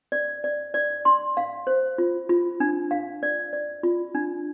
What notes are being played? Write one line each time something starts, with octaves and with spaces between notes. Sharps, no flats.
D5
D5
D5
C6
F5
C5
F4
F4
D4
F5
D5
D5
F4
D4